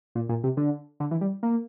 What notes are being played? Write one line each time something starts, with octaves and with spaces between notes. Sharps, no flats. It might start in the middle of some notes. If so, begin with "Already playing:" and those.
A#2
A#2
C3
D3
D3
E3
G3
A#3